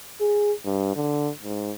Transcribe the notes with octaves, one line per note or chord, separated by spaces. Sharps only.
G#4
G2
D3
G#2